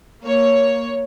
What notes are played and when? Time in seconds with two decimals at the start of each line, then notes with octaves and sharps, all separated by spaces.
0.23 A#3 C#5